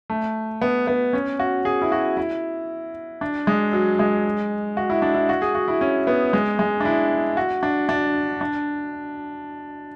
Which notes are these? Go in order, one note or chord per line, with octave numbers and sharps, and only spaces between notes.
A3
B3
B3
C#4
F#4
G#4
E4
F#4
E4
D4
G#3
F#3
G#3
F#4
E4
D4
E4
F#4
G#4
F#4
E4
C#4
B3
G#3
G#3
D4
E4
F#4
D4
D4
D4